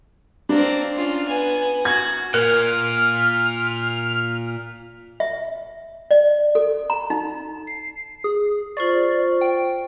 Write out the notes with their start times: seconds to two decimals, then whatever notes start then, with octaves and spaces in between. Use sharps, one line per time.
0.49 A#3 C4 D4
0.96 C#4 F4
1.28 B3 G#5
1.85 F#4 G#6
2.34 A#2 A#4 F6
5.20 E5
6.11 D5
6.55 A4
6.90 A#5
7.10 D#4
7.67 C7
8.24 G#4
8.77 F4 C5 D5 C#6
9.41 G5